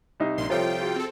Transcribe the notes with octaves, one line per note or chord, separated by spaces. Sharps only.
C2 D#4
A#1 A#2 C6
C2 F3 F4 A4 C#5 G5
F#4 G#4
C4 A4